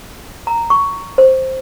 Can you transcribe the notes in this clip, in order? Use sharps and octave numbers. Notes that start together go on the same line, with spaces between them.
A#5
C#6
C5